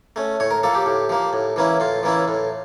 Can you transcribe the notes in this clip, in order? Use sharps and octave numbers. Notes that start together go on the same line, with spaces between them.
A3 C#4
A2 C#5
A#4
F3 A#3 A4
G4
A2
F3 A#3
A2
E3 A#3 C#4 E4
A2 F4
E3 A#3 C#4 E4
A2